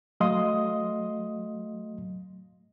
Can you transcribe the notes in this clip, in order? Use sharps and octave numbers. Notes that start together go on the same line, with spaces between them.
F#3 A3 D#5 F5 C6 D#6